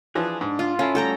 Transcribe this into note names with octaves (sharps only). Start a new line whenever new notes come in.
E3 F3 D4 G#4 F#6
G#2 D4
F4
C#4 E4 A4 F5
G3 A3 F#4 A4 G5 A#5